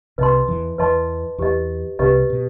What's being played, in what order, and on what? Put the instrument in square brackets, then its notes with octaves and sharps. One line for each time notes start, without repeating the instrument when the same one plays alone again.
[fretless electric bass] C2 C3 [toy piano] B4 D#5 A5 C6
[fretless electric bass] E2 E3
[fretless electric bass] E2 E3 [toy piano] B4 D#5 A5 C6
[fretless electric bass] E2 E3 [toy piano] G4 B4 D#5
[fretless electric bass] C2 C3 [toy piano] G4 B4 D#5
[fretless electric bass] B2